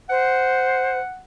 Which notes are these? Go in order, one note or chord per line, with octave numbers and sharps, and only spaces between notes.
C5 F#5